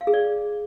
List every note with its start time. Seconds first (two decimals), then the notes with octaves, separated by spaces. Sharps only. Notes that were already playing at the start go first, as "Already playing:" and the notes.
0.01 F5
0.07 G#4
0.14 D5